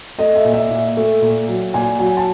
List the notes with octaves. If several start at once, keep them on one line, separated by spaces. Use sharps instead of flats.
A3 D#5
E5
A#2
E5
A#2
A3
A#2
F#3
A#2 G#5
F#3 G#5
A5